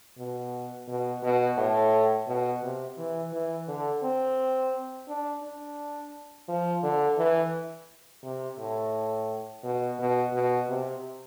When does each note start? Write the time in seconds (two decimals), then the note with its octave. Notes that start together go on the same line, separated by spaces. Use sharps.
0.18 B2
0.88 B2
1.23 B2
1.58 A2
2.27 B2
2.63 C3
2.98 E3
3.33 E3
3.68 D3
4.03 C4
5.08 D4
5.43 D4
6.49 F3
6.83 D3
7.18 E3
8.23 C3
8.59 A2
9.64 B2
9.99 B2
10.34 B2
10.69 C3